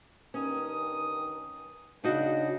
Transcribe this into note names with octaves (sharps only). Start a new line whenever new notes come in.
G2 D#3 C#4 D#6
C#3 D4 D#4 F#4